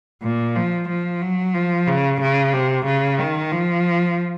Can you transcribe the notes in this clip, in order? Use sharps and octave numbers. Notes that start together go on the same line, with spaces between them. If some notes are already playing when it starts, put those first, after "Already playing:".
A#2
F3
F3
F#3
F3
C#3
C#3
C3
C#3
D#3
F3